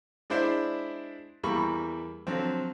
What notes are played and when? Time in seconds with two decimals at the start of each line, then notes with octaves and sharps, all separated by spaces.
0.30 G#3 D4 E4 C5 D5 E5
1.43 E2 G3 A#3 B5 C#6
2.27 D3 F3 F#3 C4